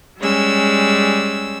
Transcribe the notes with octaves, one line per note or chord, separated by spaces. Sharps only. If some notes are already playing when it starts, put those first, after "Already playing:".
G3 G#3 C#4 E6